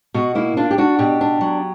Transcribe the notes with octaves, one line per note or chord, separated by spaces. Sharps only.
B2 F#4
A#3 E4
D4 F4
G4
D4 F#4
B2 G4
D4
F#3